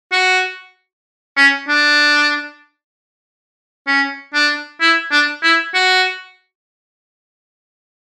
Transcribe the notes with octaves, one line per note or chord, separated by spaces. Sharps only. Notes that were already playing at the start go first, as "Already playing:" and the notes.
F#4
C#4
D4
C#4
D4
E4
D4
E4
F#4